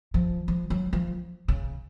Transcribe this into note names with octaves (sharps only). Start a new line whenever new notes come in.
F3
F3
F#3
F3
C#3